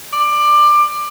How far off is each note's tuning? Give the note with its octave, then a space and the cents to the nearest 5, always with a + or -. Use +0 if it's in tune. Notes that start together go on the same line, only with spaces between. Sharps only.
D5 +20